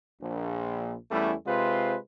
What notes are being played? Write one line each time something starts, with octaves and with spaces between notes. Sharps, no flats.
A#1
E2 G3 A3 C#4 E4
C3 G#3 F4 B4 C5